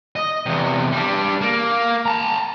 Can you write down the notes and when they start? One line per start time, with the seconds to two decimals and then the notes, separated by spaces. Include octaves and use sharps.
0.16 D#5
0.46 E2 C3
0.93 G3 D4
1.41 A#3
2.06 A5 A#5